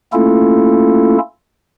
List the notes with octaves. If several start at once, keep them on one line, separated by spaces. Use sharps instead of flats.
A3 A#3 C#4 E4 F4 A4